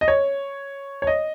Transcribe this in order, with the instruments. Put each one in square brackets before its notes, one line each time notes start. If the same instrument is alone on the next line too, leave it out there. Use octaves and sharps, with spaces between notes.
[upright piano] D#5
C#5
C#5
D#5